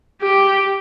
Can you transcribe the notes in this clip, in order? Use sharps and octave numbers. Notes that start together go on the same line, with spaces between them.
G4